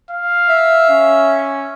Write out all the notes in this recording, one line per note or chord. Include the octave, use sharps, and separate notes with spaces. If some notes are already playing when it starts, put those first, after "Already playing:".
F5
E5
C#4